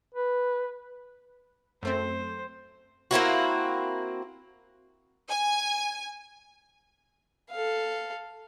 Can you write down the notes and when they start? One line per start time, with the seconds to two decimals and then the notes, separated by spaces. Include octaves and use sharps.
0.14 B4
1.83 F#2 A3 C4 C5
3.11 A#3 C4 E4 F#4
5.30 G#5
7.51 A4 F5